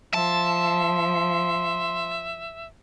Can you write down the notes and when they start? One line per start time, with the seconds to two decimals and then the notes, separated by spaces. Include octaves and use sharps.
0.14 F3 E5 A5 C6